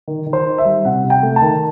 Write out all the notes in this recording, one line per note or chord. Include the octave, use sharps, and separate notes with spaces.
D#3
D#3
C5
D#4
E5
G3
C3 F#5
C3
G5
A3
A5
D#3